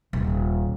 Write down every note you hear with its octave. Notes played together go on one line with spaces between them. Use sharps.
D#1